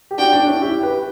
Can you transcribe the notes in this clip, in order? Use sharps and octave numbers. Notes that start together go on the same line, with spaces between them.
G4
D4 F#4 G5
D4
C#4 E4
E4 G4
G4 B4